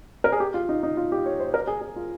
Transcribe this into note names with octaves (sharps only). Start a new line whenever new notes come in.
A#4
G#4
G4
F4
D#4
D#4
F4
G4
C#5
C5
A#4
G#4
G#4
F4